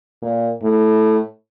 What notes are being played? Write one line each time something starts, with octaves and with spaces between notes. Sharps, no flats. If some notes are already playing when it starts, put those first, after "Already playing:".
A#2
A2